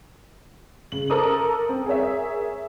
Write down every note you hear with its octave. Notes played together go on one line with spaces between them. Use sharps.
C#3 F#7
A4 A#4 C5 D6 D#6
C4
G#4 A#4 C#5 E5